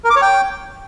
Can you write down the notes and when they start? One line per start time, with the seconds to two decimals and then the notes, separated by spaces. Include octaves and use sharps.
0.04 A#4
0.10 D6
0.16 C#5
0.22 G5